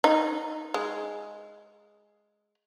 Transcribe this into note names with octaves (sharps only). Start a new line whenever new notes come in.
D#4
G#3